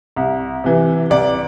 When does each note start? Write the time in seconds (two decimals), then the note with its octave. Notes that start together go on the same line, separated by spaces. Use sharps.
0.16 C2
0.64 C3 E3
1.10 C2 D5